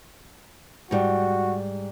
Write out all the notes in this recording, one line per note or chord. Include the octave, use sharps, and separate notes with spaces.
G#2 G3 F#4